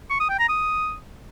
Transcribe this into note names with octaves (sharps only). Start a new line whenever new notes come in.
C#6
D#6
G5
A#5
D#6